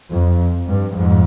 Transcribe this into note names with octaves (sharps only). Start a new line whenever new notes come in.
F2
G2
F2 G#2